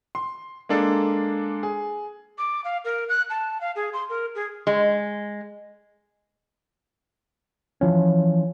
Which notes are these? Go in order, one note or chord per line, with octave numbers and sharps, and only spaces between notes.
C6
G#3 A#3 D4 A4
G#4
D6
F5
A#4
F#6
A5
F5
G#4
C6
A#4
G#4
G#3
E3 F3 C#4